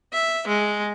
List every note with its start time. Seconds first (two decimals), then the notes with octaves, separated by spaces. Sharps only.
0.13 E5
0.47 G#3